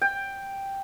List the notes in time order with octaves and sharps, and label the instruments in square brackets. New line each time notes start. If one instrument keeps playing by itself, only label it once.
[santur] G5